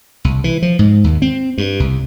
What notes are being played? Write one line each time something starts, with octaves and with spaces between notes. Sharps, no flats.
C2
E3
F3
G#2
D#2
C4
G2
C2